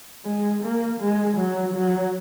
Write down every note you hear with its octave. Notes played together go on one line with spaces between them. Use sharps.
G#3
A#3
G#3
F#3
F#3